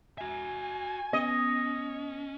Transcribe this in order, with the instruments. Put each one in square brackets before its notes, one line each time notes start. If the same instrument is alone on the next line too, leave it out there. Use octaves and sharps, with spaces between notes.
[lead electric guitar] F#4 E5 [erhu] G#5
[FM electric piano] B3 [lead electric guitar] C#4 [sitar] D#5